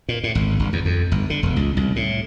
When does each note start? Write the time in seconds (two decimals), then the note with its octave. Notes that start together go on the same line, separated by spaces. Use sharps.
0.09 A#2
0.24 A2
0.35 G#1
0.59 G1
0.73 E2
0.85 F2
1.12 G1
1.30 D3
1.43 E1
1.56 C#2
1.77 C2
1.96 A2